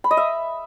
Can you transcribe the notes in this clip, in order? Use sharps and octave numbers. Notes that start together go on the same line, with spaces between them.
B5
D#5
E5